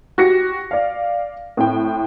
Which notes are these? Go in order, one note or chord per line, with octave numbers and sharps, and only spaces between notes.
F#4 G4 A#6 C#7
D5 F5
A2 C4 G5